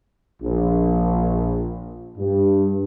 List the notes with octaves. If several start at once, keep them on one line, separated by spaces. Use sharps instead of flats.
A#1
G2